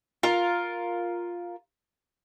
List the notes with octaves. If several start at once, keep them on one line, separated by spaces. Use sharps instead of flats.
F4 A#4